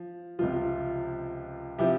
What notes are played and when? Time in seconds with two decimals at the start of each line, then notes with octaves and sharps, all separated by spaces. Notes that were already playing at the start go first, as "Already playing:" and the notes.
Already playing: F3
0.39 C#2 C3 F3 F4
1.78 C3 F3 E4 G4